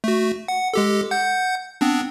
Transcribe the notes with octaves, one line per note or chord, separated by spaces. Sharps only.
A3 F#4
F#5
G#3 G4 A4
F#5 G6
B3 C4 D4